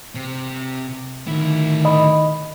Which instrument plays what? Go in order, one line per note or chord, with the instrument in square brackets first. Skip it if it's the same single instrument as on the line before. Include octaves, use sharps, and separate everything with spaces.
[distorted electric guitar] C3
[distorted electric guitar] D2 E4 [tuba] D#3
[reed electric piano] D#5 B5